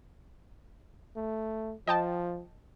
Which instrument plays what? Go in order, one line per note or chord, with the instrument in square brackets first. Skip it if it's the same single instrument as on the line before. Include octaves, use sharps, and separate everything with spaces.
[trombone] A3
[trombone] F3 [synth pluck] D#5 G5 A5